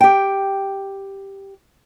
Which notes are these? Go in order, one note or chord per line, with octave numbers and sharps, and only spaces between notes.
G4 G5